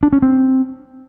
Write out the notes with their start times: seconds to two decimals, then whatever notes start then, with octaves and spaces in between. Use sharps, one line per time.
0.03 D4
0.13 C#4
0.22 C4